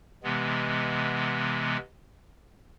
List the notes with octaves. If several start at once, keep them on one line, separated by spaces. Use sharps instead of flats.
C3 E3 G#3 B3